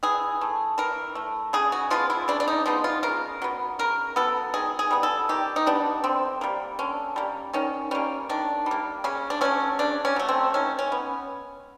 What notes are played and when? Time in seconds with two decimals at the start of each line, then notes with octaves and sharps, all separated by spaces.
0.03 E3 G#4
0.41 A3
0.78 E3 A#4
1.15 A3
1.53 C#3 G#4
1.72 F#4
1.90 F3 G#3 B3 F4
2.10 E4
2.28 C#3 D4
2.40 D4
2.48 D#4
2.66 F3 G#3 B3 D#4
2.84 F4
3.03 C#3 A#4
3.42 F#3 B3
3.79 C#3 A#4
4.16 F#3 B3 A4
4.54 D#3 G#4
4.79 G#4
4.91 G3 B3
5.03 A4
5.29 D#3 G4
5.56 D#4
5.66 G3 B3 D4
6.04 D3 C4
6.41 G3 A#3
6.79 D3 C#4
7.16 G3 A#3
7.53 D#3 C#4
7.91 G3 A#3 C#4
8.29 D#3 D4
8.66 G3 A#3
9.04 C#3 C#4
9.30 D4
9.41 F#3 A3 C#4
9.79 C#3 D4
10.05 C#4
10.16 F#3 A3
10.29 C4
10.54 D#3 C#4
10.79 C#4
10.92 B3